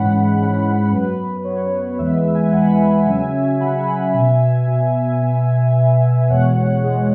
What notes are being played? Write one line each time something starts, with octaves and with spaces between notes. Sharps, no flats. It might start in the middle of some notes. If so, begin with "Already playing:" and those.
Already playing: G#2 E3 G#3 C#4 F#5 B5
G#2 E3 G#3 C#4
F#2 F#3 B3 B4
B4
F#2 F#3 B3 C#5
E2 E3 G#3 B3 B4 E5
E5 G#5
E2 E3 G#3 B3 F#5 B5
C#3 F#3 C#4 E5 G#5
C#3 F#3 C#4 F#5 B5
B2 B3 E5 G#5
B2 B3
B2 B3
B2 B3
E2 B2 G#3 C#5 F#5
E2 B2 G#3